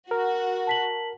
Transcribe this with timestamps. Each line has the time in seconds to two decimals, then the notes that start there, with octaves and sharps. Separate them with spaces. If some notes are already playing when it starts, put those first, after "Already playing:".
0.11 F#4 A#4
0.67 A5 B6 F#7